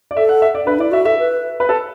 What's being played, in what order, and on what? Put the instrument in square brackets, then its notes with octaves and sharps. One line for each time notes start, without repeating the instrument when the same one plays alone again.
[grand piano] D5
[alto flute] A4 [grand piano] E5
[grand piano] F#5
E5
D5
[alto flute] D4 [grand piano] B4
[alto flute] E4 [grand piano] D5
[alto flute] F#4 [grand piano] E5
[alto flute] A4 [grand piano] E5
[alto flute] B4
[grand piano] B4
A4